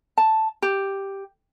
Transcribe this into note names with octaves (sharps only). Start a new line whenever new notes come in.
A5
G4